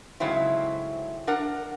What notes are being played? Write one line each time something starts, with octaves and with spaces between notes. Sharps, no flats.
G#2 C#3 F#3 A3 C4 E4
D4 A#4 F#5